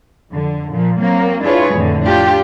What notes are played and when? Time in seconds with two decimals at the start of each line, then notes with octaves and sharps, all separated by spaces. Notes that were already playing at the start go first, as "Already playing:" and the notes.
0.30 F2 D3
0.69 A#2 F3
0.98 F#3 A#3 C4
1.43 D4 E4 F4 G#4 B4 C#5
1.73 F2 A2 D3
2.05 D4 F4 G4